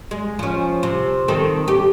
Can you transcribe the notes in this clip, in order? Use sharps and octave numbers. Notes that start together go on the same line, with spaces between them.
G#3
F3 C#4
C3
D#3 C4 A4
G4